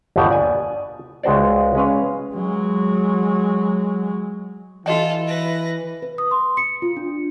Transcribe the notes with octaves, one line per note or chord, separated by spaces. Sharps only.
G1 D#2 B2 B3 G4 F#5
D5 G#5
C#2 G#3 F#4 C5 D5
G#3 C#4 B4 F5
F#3 G#3
E3 F4 F#4 A4 D#5 G5
B4 A#6
B4
D#6
C6
C#7
F4
D4